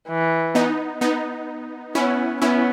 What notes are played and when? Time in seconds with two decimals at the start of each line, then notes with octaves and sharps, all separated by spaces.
0.08 E3
0.55 B3 D#4
1.01 B3 D#4
1.95 B3 C#4 E4
2.42 B3 C#4 E4